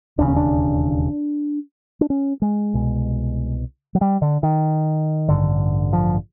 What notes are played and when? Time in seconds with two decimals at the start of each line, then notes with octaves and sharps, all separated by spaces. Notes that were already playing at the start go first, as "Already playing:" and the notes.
0.18 E1 D#2 C#3 D4
0.28 C#4
0.36 D4
2.01 D4
2.10 C#4
2.42 G#3
2.74 C2 B2
3.95 F#3
4.01 G3
4.22 D3
4.43 D#3
5.28 A1 G2 D3
5.93 F3